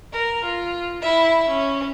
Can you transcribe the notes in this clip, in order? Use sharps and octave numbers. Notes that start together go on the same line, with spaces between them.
A#4
F4
E4 E5
C#4